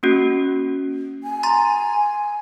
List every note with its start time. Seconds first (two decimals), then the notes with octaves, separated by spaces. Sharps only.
0.03 A#3 C#4 F#4
1.23 G#5
1.43 A#5 C6 A6